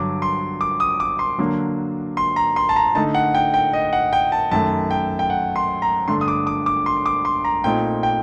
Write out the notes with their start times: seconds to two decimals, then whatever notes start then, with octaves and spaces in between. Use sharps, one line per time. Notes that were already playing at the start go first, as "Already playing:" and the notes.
Already playing: G2 D3 F#3 D6
0.22 C6
0.61 D6
0.80 D#6
1.00 D6
1.19 C6
1.38 D3 F#3 A#3 D4
2.17 C6
2.36 A#5
2.56 C6
2.69 A5
2.76 A#5
2.95 D3 A3 D#4 A5
3.15 F#5
3.35 G5
3.54 G5
3.73 D#5
3.93 F#5
4.13 G5
4.32 A5
4.51 F#2 D#3 A3 A5
4.91 G5
5.19 G5
5.30 F#5
5.56 C6
5.82 A#5
6.08 G2 D3 A3 D4 C6
6.21 D#6
6.28 D6
6.47 D6
6.66 D6
6.86 C6
7.06 D6
7.25 C6
7.45 A#5
7.64 A#2 A3 C4 D#4 G5
8.03 G5